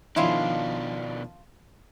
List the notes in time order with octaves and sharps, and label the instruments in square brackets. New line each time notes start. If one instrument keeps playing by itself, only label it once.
[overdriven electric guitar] B2 D4 [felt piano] D#3 F3 [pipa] C#4 E4 F4